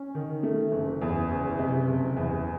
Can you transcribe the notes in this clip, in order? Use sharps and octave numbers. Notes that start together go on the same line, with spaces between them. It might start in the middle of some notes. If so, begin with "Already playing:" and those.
Already playing: C#4
D#3
A3
F#1
E2
F#1
C3
F#1
E2